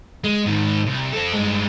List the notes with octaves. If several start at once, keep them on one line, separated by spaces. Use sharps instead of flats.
G#3
G#2 D#3
C2
C4 A4
G2 G#3